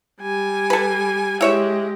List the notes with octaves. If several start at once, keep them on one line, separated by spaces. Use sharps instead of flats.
G3 G#5
A4 B4
G#3 E4 G4 C#5 E5